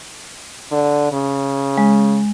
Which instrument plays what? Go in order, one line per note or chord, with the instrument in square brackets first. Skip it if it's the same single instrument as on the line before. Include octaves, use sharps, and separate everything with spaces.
[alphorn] D3
C#3
[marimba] G#3